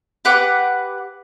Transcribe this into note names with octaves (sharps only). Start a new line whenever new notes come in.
G4 B4 F#5 D6